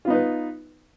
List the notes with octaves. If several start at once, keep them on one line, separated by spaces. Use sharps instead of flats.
B3 D#4 F4 B4